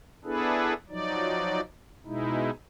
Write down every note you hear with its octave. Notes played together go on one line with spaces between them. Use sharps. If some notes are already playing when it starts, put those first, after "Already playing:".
B3 D4 E4 G#4 A4 B4
F3 F#3 D#4 D5
B2 G#3 D#4 E4